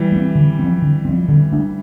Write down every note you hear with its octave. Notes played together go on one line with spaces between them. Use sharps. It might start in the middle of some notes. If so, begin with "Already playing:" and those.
Already playing: E3 G3
A3 C4
D3
F3 C4
D3
F3 C4
D3
A3 D4